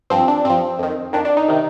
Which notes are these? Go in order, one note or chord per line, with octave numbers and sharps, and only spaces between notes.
G2 F3 C4
D4
G2 F3 C4
F2 D#3
F2 D#3 D4
D4
D#4
C3 D#3